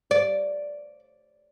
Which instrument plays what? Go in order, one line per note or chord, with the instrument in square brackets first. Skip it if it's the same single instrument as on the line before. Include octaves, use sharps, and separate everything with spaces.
[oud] D5